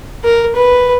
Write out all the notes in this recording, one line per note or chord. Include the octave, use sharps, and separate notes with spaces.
A#4
B4